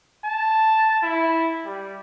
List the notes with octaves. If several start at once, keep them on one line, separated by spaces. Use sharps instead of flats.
A5
E4
G3